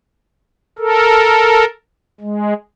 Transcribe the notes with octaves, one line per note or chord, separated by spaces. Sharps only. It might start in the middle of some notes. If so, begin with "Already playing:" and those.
A4 A#4
G#3